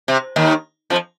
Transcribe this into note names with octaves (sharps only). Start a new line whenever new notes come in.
C3
D#2 D#3
F2 F3